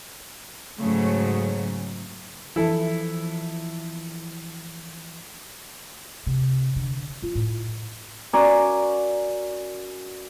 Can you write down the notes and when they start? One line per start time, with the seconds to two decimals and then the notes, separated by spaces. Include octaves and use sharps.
0.77 G#2 C#3 F#3 A3
2.56 E3 F3 E4 A4
6.27 C3
6.76 D3
7.22 F4
7.35 A2
8.33 C#4 F#4 A#4 D5 G#5 A#5